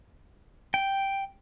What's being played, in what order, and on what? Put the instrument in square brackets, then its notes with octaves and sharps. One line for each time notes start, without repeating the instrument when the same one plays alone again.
[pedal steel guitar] G5